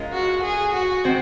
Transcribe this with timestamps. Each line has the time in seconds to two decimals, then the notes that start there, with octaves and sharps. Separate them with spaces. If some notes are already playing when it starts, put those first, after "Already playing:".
Already playing: G#3 C#4 F4 A#4
0.13 F#4
0.43 G#4
0.73 F#4
1.04 D#3 G#3 C4 F#4 C5